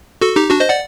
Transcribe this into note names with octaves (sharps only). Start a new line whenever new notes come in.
F#4 A4
D#4 G4
D4 F#4
C5 D#5
D5 F#5